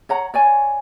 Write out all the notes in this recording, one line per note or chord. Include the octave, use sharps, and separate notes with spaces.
C#5 F#5 A#5
C#5 D5 G#5